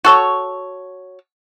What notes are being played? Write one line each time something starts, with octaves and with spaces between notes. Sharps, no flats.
F#4 A4 C#5